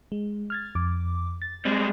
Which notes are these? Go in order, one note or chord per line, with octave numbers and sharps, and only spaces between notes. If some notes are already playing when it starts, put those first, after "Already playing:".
G#3
F6 G#6 A6
F2 D6
A6
G3 G#3 C4